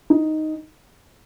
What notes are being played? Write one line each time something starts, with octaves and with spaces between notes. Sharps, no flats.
D#4